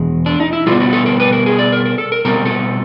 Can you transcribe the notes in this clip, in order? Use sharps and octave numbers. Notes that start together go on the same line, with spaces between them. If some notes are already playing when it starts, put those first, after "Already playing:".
Already playing: E2 B2 G#3
D4
D#4
E4
B2 G3 B3 F4
F#4
A4
A#4
B4
A#4
G#4
D5
A#4
A#4
A4
A#4
B2 G3 C4 A#4
A4